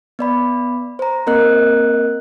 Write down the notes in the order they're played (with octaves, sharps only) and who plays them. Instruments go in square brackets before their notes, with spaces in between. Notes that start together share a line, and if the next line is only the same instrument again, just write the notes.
[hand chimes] B3 D5 B5
C5 A#5
A#3 C4 A#4 D#5 F#6